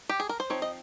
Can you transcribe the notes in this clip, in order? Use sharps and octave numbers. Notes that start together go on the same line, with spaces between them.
G4
G#4
A#4
C5
F3 C4 D#4 C#5
D#5